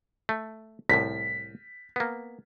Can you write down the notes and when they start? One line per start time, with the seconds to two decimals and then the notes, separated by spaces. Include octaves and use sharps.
0.29 A3
0.89 C2 A2 B6
1.96 A#3 B3